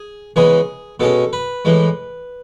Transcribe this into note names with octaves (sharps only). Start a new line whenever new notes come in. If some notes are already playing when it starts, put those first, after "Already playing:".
Already playing: G#4
C#3 E3 G#3 B3 G#4
B2 G#3 C#4 A4
B4
A2 E3 G#3